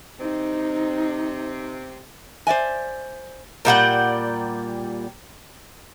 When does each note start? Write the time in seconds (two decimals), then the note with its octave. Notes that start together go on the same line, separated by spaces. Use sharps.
0.20 C3 C4 D#4
2.47 C5 D5 E5 G#5
3.65 A#2 G3 F#5 G5